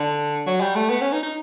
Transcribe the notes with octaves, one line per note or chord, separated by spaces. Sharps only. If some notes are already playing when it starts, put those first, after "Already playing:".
Already playing: D3
F#3
G3
A3
B3
C#4
D#4
D#4